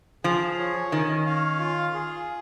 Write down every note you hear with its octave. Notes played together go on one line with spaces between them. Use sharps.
F3 G#4
C#5
D#3 C#4
F5
F4
G#4